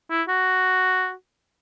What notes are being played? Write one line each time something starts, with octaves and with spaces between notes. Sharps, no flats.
E4
F#4